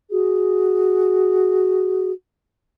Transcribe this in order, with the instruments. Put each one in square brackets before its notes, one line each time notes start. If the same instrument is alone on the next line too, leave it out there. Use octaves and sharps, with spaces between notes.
[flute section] F#4 G#4